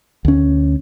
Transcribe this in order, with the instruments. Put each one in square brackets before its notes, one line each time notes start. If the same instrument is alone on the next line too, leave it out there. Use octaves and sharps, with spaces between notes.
[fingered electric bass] D2 C#4